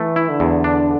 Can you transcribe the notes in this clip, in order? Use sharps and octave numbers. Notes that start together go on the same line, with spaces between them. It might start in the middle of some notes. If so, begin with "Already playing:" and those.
Already playing: E3 A3
E4
D3
E2
D4